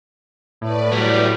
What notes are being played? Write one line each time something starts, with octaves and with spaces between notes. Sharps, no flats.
A2 B4 D5
F#3 G3